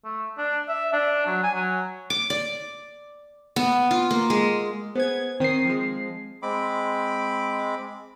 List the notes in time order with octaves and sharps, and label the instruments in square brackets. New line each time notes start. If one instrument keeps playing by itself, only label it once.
[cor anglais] A3
D4
E5
D4
F#3
G#5
F#3
[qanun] D6
D5
B3
F4
A#3
G#3
[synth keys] B3 G#4 G#6 [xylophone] C5
[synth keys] D#3 D#6 [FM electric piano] C4 C7
[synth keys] F3 G#3
[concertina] G#3 C4 B5 D6